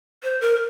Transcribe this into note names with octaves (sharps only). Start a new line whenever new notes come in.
C5
A#4